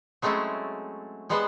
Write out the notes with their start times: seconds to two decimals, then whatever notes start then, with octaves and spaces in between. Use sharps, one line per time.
0.22 F#3 G#3 A3 C4 C#4 E4
1.29 G3 G#3 B3 B4 C5